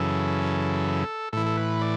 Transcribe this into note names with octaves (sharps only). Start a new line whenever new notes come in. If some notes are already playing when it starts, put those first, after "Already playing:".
Already playing: F#2 C#3 E3 A4
A2 E3 A4
A4
B4
D5